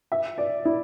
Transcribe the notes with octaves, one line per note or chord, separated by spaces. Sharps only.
E5
D5
E4